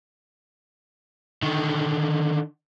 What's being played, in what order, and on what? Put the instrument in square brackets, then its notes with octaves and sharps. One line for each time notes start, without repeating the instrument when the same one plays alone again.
[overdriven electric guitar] D3 D#3